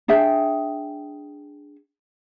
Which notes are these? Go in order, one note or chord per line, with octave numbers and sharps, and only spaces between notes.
D4 G#4 E5 G5